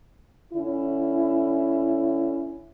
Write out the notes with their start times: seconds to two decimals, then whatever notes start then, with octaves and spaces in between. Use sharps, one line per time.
0.54 D3 C#4 E4